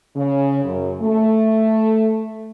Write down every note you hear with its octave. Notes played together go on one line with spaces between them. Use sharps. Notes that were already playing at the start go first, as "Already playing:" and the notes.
C#3
F#2
A3